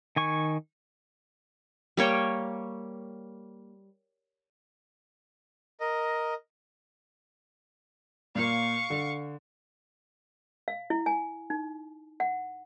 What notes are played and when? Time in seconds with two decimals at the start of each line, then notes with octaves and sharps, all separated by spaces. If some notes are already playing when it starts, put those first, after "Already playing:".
0.16 D#3 G#5 C#6
1.97 G3 A#3 C#5 G5
5.81 A#4 D#5
8.35 A#2 A#3 F5 C#6
8.90 D3
10.68 F5
10.90 E4
11.06 G#5
11.50 D#4
12.20 F#5